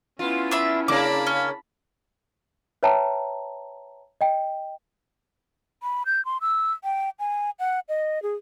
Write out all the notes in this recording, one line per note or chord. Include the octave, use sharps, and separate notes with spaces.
B3 C#4 E4 F4
D4 E5 B5
C#3 A#3 D4 A5 B5 D6
C#4
B4 C#5 E5 G5 A5 A#5
D#5 G5
B5
G6
C6
E6
G5
G#5
F#5
D#5
G#4